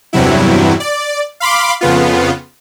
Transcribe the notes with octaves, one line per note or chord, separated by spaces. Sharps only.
E2 G2 C3 F#3 E4
D5
F5 B5 C6 D6
F2 C#3 B3 F4